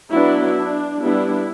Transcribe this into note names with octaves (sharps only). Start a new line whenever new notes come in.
F#3 B3 D4 E4
D4
G3 B3 D4 E4